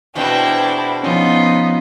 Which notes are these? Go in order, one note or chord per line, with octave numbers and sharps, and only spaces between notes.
E2 B2 C4 D4 E4 F#4 G5
F3 B3 C#4 D#4 F4